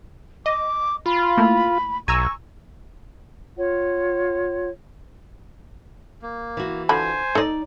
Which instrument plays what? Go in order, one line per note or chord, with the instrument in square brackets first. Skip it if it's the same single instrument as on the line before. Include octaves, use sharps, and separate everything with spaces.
[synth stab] D#5 [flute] D6
[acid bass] F4 [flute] B5
[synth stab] A3 A#3 E4
[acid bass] B1 [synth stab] G#5 A#5 E6 [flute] C#6
[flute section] F4 C#5 F#5
[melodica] A#3
[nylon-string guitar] E3 F#4
[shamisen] D3 F3 B5 [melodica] C5 G#5
[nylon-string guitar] D#4 D5 [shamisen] A4 D#5